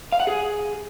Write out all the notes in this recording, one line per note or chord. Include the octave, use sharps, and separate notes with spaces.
F5
F#5
G#4